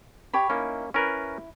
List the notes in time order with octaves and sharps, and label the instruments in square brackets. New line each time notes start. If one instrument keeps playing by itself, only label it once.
[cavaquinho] G4 C#5 B5
[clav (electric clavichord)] A#3 C#4 [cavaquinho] D#4 E4
[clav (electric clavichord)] C#4 A#4 B4 [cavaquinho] E4